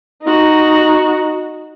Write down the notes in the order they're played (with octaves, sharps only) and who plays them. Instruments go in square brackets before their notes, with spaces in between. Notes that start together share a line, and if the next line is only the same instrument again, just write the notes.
[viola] D#4 F#4